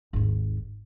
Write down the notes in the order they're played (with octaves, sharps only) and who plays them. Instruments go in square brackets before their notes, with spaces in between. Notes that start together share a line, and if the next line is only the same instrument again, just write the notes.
[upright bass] G#1 D#2